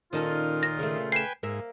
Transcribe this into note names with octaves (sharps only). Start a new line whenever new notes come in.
A#2 D#3 C#4 D#4 F4 A4
D#2 A#6
C#3 A3
B4 G5 G#5 C7 E7
G#2 A#3 E5